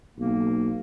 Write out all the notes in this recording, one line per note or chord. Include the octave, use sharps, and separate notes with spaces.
B1 A#3